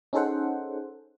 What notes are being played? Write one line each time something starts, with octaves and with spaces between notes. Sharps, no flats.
C#4 D#4 G#4 A4 C5 F#5